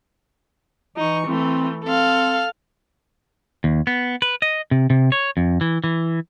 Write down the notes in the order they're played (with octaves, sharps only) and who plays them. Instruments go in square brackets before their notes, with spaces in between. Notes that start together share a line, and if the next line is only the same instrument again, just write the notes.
[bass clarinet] E3 [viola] D#4 C#6
[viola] E3 A3 [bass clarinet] C4
[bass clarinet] C4 [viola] A4 F5
[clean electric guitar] D#2
B3
B4
D#5
C3
C3
C#5
F2
E3
E3